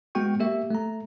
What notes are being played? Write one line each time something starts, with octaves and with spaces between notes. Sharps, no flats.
G#3 B3 F#4 G5 C#6
A#3 G4 E5
A3 A#5